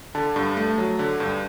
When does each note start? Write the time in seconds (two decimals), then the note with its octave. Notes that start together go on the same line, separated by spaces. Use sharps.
0.15 D3 A5
0.36 G2
0.57 A3
0.78 F#3
0.99 D3
1.20 G2